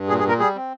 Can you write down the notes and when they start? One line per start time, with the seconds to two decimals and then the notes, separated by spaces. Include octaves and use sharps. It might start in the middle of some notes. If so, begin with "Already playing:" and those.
Already playing: G2
0.08 A#2 G#4
0.19 G#4
0.24 A#2 A#4
0.39 G3 G#4
0.55 C4